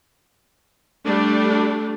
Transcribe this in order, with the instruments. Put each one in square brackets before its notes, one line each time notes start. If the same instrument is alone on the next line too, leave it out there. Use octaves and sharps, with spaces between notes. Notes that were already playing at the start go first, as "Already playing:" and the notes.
[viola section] G3 A3 D4